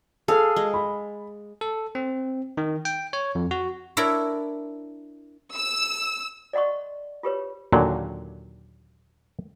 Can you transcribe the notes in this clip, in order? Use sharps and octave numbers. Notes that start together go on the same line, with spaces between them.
G#4 A4 F5
G#3
B5
A4
C4
D#3
G5
C#5
F2
F#4
D4 E4 A4 A#4 C#5 D5
E6
D5 D#5 F#5 C6 C#6
F4 G4 B4 C#5
D#2 A#2 D3 F#3